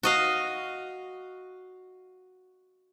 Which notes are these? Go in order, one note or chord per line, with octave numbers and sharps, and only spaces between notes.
F#4 D#5 F5